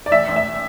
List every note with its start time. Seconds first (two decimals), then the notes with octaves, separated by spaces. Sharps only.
0.06 D5
0.11 A1 E5
0.28 A1
0.36 E5